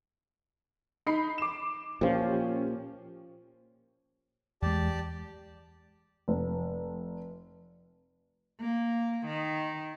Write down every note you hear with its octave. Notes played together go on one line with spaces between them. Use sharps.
D#4 B5 C7
D6 E7
A#2 F3 C#4 G4
E2 G#3 G4 D5 A5
F1
A#3
D#3